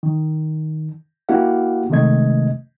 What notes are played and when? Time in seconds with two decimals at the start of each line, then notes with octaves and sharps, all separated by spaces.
0.03 D#3
1.29 A#3 E4 F#4 G4 F5 F#5
1.90 C3 D#3 G#3 A3 D#5 G#6